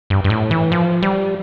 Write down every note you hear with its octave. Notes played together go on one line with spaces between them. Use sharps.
G2
G2
A2
E3
F3
G3